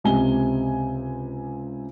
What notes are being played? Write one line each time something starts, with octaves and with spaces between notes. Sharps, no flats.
C#2 C3 D#5 G#5 G7